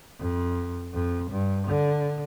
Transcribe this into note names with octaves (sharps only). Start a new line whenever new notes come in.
F2
F2
G2
D3